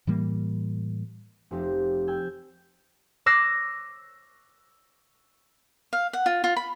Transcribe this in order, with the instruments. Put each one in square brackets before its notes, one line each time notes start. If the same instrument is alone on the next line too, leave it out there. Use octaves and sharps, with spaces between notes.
[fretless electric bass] A2 E3 G3 A#3
[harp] F1 C4 G4
G5 G#5 E6 G6 G#6
C#5 D6 E6 F#6 A#6 C7
[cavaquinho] F5
F#5
F4
F4
B5